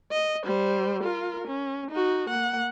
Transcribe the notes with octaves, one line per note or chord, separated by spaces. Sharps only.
D#5
G3 C5
F4 A#4
C#4
D#4 F#4
A#3 F#5